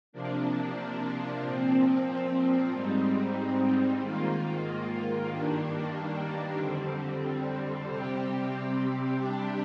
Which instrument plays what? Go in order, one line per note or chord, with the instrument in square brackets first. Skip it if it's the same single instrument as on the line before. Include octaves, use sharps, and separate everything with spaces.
[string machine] C3 F3 A#3 D4
A#2 F3 C4
G#2 G3 C4 D#4
G#2 D#3 A#3 F4
G2 D#3 G3 A#3 D4
F2 D3 G3 C4
C3 G3 C4 G4
C3 G3 D4 G4